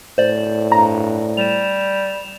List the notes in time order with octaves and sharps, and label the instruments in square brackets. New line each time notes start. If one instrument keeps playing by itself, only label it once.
[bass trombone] A2 [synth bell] C5 D5
[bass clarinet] G2 [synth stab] A#5
[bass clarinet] G3 [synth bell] E7 F7